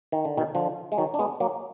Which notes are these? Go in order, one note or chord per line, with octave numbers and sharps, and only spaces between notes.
D#3
D3
B2 D#3
D3 F3
G#3
D#3 F#3
D4
G#3 B3
F#3 A#3